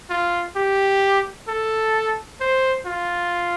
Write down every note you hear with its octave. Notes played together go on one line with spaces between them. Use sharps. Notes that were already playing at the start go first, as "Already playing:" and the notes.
F4
G4
A4
C5
F4